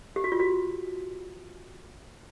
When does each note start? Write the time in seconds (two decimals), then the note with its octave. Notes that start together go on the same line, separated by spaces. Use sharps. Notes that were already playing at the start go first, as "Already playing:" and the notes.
0.16 G4
0.24 F#4
0.32 F4
0.40 F#4